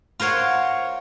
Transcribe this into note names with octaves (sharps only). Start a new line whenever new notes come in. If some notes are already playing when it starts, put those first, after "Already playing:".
F4 A#4 C5 C#5 F#5